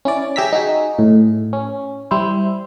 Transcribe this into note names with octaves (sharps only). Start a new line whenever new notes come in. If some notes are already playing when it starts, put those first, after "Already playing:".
C#4 E4 D5
G4 G#4 E5 A#5 B6
D#4 F#4 G#4
A2
C#4
G3 E4 C5